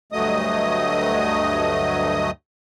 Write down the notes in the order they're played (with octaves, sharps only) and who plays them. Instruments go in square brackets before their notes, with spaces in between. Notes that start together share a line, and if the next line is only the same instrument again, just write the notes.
[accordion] D2 G2 F#3 A3 D#5 D#6